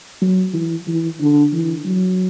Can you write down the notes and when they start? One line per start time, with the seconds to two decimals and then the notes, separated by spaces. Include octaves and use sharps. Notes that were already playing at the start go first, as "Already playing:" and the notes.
0.22 F#3
0.54 E3
0.87 E3
1.20 D3
1.53 E3
1.86 F#3